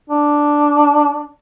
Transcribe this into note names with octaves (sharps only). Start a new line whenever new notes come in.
D4